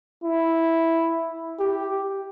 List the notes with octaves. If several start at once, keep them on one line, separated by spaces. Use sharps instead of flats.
E4
G4